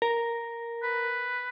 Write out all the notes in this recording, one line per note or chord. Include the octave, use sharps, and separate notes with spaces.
A#4
B4